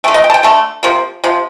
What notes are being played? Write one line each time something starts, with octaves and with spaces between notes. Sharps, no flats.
D3 A3 G5
D#5
G5
A5
G5
D3 A3 A5
C3 F3 A#3
C3 F3